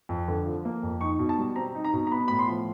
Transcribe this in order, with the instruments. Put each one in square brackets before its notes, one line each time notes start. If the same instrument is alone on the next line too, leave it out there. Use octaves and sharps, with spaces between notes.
[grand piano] F2
D3
F3
A#3
F2
D#4 C#6
B2
A5
G3
C4 A#5
D#4
A#5
B2
A#5
B3 B5
A2 B5
C6
F3